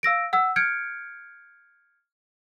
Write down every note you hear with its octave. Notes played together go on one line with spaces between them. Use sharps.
F5 E6 A#6 D7
F#5 E6
F6 G6 G#6 C#7 D7